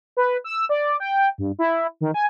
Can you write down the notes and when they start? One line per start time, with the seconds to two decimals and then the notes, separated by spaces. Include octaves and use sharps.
0.17 B4
0.44 E6
0.69 D5
1.00 G5
1.38 G2
1.59 E4
2.01 D#3
2.14 G#5